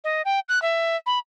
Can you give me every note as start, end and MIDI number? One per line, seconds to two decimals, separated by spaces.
0.04 0.22 75
0.25 0.40 79
0.49 0.61 90
0.62 0.96 76
1.06 1.19 83